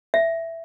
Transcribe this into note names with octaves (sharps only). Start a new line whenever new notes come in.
E5